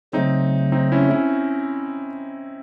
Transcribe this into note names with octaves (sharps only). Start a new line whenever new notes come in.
C#3 F#3 A3 C4 D#4
C4 D#4
C#4 E4
C#4 E4